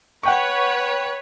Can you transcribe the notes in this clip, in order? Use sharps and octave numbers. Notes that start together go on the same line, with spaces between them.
B4 C#5 F#5 G5 C#6